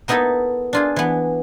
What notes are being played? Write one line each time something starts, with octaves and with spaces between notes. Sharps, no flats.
A#3 B3 D#4 E4 A4 B4
D4 F4 G#4
E3 B3